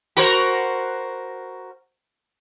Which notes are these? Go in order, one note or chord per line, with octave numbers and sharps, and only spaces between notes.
F#4 A#4 C5